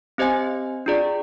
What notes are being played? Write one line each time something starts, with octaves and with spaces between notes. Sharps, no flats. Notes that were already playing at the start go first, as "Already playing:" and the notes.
C4 G4 C5 D#5 G#5
D4 F4 G#4 D5